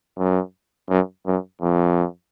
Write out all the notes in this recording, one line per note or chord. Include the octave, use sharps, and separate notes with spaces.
F#2
F#2
F#2
F2